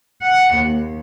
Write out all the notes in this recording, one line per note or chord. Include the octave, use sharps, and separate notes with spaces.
F#5
D#2